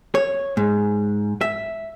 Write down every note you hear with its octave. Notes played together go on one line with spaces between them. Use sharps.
C#5
G#2
E5